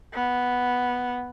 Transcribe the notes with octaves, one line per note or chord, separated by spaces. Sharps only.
B3